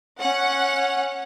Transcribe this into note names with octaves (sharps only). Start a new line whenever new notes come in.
C#4 F#5